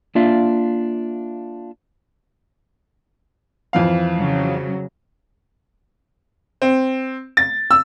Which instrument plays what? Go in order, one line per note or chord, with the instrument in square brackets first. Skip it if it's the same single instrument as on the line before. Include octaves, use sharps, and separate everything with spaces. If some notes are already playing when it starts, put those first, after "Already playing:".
[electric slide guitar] A#3 D4 F4 E5 F5
[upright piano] F2 E3 F5
[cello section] C#3 F#3
[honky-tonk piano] C4
A6
E6